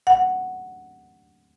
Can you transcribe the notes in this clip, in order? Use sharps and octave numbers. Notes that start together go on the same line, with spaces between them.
F#5